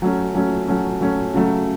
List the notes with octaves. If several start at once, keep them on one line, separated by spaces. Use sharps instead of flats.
F#3 A3 C#4
F#3 A3 C#4
F#3 A3 C#4
F#3 A3 C#4
C#3 F#3 A3